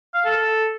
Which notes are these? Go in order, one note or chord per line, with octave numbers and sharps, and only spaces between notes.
F5
A4
A4